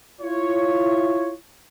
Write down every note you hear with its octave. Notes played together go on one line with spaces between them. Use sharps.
E4 F4 C#5